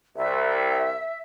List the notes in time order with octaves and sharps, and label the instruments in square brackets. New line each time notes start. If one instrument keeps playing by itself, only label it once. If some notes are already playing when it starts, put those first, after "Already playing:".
[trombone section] C2 [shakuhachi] E5